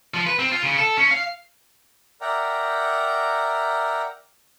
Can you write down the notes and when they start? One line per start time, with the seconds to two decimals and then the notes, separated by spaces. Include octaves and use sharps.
0.14 F3
0.27 B4
0.39 C4
0.52 F4
0.63 C#3
0.78 A4
0.97 C#4
1.11 F5
2.21 A#4 D5 E5 F#5 G5 A#5